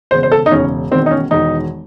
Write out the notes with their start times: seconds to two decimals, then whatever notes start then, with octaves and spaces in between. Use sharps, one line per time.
0.11 E1 E2 C#3 C5
0.23 C5
0.32 A4
0.46 D#4
0.51 E1 E2 C#3 C#4
0.91 E1 E2 D#3 C4
1.06 D#4
1.11 C#4
1.31 E1 E2 D#3 D#4